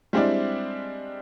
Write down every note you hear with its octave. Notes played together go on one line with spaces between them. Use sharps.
G3 G#3 C4 D4 E4 D5